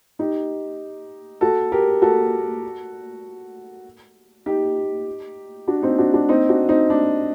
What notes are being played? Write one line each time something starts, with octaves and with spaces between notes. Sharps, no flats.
D#4 G4
F#4 A4
G4 A#4
F#4 A4
D#4 G4
D4 F#4
C4 D#4
D4 F#4
D4 F#4
C4 D#4
D4 F#4
C4 D#4
D4